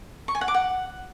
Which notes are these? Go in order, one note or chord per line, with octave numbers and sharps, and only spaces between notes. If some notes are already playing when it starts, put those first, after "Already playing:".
C#6
G#5
F#5
D6
F#5